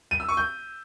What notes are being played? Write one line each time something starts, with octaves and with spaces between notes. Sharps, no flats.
D#7
E6
C#6
G6